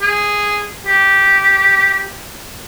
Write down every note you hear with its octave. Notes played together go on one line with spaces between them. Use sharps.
G#4
G4